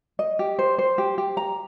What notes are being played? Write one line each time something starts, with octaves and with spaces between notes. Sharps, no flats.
D#5
G4
C5
C5
G4
G4
A#5